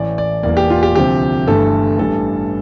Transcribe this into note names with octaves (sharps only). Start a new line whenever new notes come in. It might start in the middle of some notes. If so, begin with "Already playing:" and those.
Already playing: A1 A2 E3 A3 D5
D5
E1 E2 E3 A#3 D5
G4
F4
G4
D2 C3 F3 G4
G1 G2 E3 A3 A4
A1 G2 E3 G3 A4